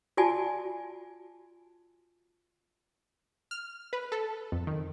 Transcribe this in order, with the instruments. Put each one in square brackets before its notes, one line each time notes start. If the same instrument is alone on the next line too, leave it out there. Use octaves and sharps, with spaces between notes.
[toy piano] F4 F#4 D5 G#5 A5
[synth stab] F6
B4
A4
F2
D#3